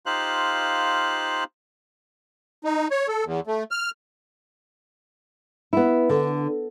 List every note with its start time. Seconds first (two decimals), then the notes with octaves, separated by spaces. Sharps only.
0.06 D#4 F4 G4 C5 F5 F#6
2.64 D#4
2.91 C#5
3.08 A4
3.25 E2
3.47 A3
3.71 F6
5.73 B3 E4
6.09 D3